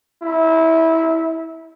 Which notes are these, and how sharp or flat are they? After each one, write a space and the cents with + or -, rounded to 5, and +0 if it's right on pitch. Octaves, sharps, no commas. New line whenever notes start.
E4 -20